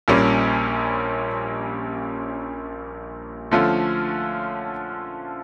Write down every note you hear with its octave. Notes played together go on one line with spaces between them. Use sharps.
A#1 A#2 G3 A#3 C#4
D3 F3 A3 C#4 F4